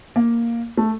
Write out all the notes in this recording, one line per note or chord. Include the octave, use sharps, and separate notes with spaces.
A#3
A3